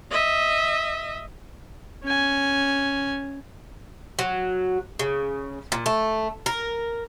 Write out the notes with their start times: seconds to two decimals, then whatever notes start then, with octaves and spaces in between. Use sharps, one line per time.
0.11 D#5 E5
2.04 C#4 G#5
4.19 F#3
4.99 C#3
5.72 A#2
5.86 A3
6.46 A#4